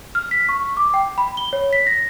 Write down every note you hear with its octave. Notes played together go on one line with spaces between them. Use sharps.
F6
B6
C#6
D6
G5
B5
G7
C#5
B6
A#6